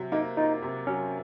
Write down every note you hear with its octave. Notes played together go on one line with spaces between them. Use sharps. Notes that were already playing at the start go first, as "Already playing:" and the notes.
Already playing: C3 F#3
A#3 D#4
D#4 F4
C3
F#3 C#4